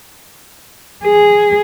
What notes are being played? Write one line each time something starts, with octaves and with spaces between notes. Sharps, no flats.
G#4